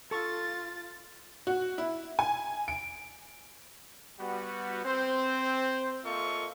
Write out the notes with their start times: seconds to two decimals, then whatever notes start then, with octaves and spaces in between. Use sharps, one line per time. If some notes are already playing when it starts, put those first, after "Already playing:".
0.11 F4 A4 C#6 A6
1.47 F#4
1.78 E4
2.19 G#5
2.68 D7
4.20 G3 B3 F#4
4.84 C4 C5
6.05 A#3 F4 A4 D#5 E5 C#6